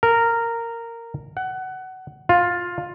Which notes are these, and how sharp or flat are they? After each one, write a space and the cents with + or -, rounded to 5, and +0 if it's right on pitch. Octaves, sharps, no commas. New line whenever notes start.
A#4 -10
F#5 +20
F4 +10